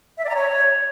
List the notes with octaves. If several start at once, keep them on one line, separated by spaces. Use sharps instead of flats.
E5
D5
A#5
C#5